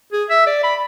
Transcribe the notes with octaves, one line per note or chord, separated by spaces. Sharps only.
G#4
E5
D5
B5